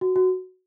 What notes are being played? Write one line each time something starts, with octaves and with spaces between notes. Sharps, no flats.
F#4
F#4